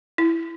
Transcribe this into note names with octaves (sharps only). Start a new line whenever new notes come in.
E4